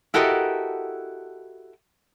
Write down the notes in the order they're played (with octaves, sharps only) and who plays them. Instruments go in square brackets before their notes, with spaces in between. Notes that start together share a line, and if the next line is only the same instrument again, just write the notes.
[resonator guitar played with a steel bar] E4 F#4 G4 A4 A#4 D#5